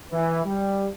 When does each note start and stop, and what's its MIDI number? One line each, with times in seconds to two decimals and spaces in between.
0.11 0.40 52
0.45 0.87 55